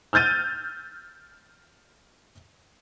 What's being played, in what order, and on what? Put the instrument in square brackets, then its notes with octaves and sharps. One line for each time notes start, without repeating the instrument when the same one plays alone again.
[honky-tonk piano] E6 F6 G6 A6 D#7